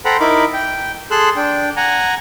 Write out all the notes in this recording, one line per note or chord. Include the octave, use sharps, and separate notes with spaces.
A4 C5 F#5 G5 A#5 B5
D#4 E4 A#4 B5 D6
G5
G#4 A4 C6 E6 F#6
D4 G5
F#5 G#5 A#5